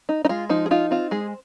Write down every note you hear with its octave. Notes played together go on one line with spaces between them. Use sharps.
D#4
D#4
G#3 F4
F3 D#4
G#4
D#4 F4
C4 F4
G#3 G#4